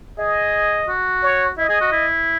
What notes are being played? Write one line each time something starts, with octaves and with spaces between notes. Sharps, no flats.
G#4 D#5
F#4
C#5
E4 D#5
G#4
F#4
E4